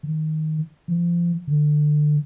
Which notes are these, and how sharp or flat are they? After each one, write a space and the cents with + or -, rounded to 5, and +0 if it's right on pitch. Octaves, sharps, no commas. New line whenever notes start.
D#3 +5
F3 -25
D3 +25